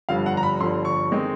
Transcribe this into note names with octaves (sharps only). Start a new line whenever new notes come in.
G1 G2 D3 F3 F5
F#5
A#5
B5
G1 G2 D3 F3 C6
C#6
D#3 G#3 C4 D#4